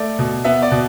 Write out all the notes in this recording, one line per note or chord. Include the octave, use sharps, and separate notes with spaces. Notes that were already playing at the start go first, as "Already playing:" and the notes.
Already playing: A3 D5
B2
B3 E5
D5
B2